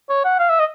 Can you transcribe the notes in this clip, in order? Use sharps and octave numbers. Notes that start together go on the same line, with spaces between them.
C#5
F#5
F5
E5
D#5